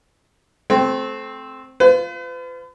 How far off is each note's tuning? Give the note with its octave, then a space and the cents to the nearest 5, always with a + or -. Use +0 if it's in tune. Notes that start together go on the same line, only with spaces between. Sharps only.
A3 -20 C4 +0
F4 -10 B4 +45